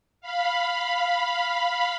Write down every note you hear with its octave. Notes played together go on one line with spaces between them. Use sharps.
F5 B5